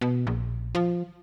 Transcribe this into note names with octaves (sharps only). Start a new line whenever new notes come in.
B2
A#1
F3